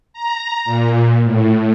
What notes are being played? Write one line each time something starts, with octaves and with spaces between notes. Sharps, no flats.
A#5
A#2
A2